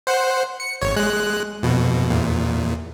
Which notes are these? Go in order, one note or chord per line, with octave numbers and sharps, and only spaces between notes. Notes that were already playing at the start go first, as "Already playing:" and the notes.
C5 F#5
C#7
G#1 C#5
G#3 F#6
F2 B2
E2 A#2